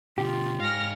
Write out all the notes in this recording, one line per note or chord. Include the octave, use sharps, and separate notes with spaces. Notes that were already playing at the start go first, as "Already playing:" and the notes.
B2 D3 F4 G4
G#2 F5 G#5 F6 A#6